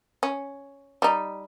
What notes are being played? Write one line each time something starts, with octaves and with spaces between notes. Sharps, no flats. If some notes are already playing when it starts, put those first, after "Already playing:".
C#4
G3 D#4